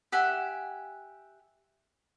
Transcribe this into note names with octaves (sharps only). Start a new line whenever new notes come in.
G4 E5 F#5 G#5